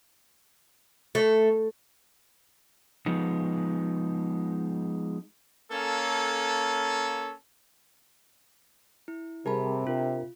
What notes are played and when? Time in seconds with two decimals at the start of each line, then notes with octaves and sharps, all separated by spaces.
1.15 A3
3.06 F3 G#3 B3 D#4
5.71 A#3 C#4 A4
9.08 E4
9.46 C3 G3 G4 G#4 A#4 A5 B5
9.87 D4 F4 A#4